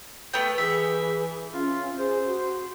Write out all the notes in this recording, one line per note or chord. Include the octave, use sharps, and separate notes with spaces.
A3 B3 B4 G5
E3 G#4 E5
C#4 F4
G#4 C5
F#4